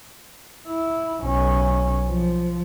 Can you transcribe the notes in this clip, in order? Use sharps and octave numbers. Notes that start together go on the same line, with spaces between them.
E4
B1 C#4
F3